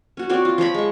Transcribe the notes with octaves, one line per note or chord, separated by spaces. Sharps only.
C#4 F#4
C4 F#4 C#5 D5
F4
F3 C#5 A#5 B5
G#3 C#6